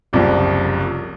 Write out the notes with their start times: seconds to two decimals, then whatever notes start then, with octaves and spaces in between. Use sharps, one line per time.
0.13 F#1 C2 F3